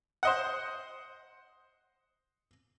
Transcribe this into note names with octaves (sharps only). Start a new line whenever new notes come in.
C5 D#5 F#5